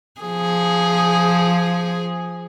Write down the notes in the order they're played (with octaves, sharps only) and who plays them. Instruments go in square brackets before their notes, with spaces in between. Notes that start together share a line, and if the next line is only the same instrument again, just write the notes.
[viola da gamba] F3 G#4